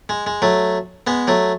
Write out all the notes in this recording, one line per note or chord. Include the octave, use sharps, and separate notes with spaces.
G#3
G#3
F#3 A3
G#3 B3
F#3 A3